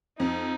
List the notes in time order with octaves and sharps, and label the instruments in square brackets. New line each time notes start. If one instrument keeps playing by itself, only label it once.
[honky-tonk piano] F2 [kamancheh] D#4